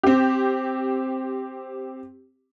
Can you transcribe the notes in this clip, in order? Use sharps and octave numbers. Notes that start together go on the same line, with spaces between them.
C4 G4